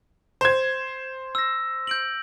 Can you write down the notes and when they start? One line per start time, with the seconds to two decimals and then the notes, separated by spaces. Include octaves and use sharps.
0.41 C5 G#6
1.35 E6 A#6
1.87 G6 D7 F#7